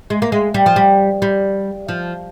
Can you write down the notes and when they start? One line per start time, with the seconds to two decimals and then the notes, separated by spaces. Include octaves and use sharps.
0.10 G#3
0.22 A#3
0.32 G#3
0.54 G3
0.66 F3
0.76 G3
1.22 G3
1.88 F3